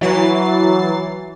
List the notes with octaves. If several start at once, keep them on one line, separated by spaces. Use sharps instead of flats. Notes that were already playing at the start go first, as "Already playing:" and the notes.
E3 F#3 A6 C7